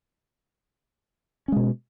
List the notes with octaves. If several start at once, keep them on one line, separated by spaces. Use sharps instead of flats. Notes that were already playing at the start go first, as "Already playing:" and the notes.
B2 G#3 C#4